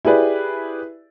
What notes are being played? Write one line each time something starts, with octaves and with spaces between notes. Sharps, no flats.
E4 G4 G#4 B4 D5